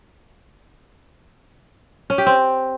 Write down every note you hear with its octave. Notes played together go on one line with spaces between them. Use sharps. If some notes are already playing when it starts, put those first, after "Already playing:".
C#4
G4
C4